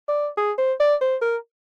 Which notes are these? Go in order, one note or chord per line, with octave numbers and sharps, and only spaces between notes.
D5
G#4
C5
D5
C5
A#4